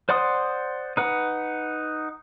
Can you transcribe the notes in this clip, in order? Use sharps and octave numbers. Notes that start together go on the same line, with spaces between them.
C5 D5 F#5 C6 D#6
D#4 B4 F#5